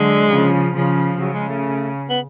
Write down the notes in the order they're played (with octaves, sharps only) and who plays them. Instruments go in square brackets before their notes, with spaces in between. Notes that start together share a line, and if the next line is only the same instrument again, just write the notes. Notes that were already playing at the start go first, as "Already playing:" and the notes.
Already playing: [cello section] D3 F#3 [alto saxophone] G#3
[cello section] C#3 F3
C#3 F3
[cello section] C#3 [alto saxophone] F#3
[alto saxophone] G#3
A3
B3